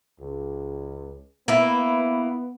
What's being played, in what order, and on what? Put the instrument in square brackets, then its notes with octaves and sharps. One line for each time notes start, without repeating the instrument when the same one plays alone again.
[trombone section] C#2
[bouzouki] A#3 E4 [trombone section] B3 B4